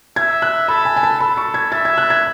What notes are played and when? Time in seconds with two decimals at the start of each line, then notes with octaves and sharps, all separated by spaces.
0.16 E5 G#6
0.42 F#6
0.68 A4 B5
0.85 G#5
0.96 G#5
1.03 A5
1.20 A4 B5
1.37 C#6
1.54 G#6
1.72 E5 A6
1.85 G#6
1.98 F#6
2.10 G#6